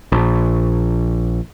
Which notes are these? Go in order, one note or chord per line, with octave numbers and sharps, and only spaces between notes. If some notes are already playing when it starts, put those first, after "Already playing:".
A#1